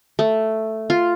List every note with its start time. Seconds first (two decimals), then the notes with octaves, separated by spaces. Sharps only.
0.19 A3
0.90 F4